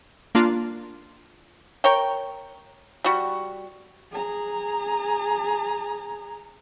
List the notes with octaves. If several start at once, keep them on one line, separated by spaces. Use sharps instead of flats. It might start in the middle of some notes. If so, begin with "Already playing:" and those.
A#3 D4 F4
A#4 C#5 G5
G3 F#4
G#4 A#5